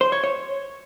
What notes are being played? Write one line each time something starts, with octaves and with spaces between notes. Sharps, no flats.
C5
C#5
C#5